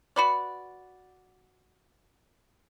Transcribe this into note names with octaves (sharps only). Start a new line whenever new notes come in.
F#4 B4 D5